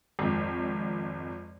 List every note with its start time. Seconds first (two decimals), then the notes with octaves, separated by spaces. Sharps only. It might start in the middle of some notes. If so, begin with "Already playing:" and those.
0.19 G#1 F2